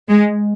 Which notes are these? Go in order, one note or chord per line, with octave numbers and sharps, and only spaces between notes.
G#3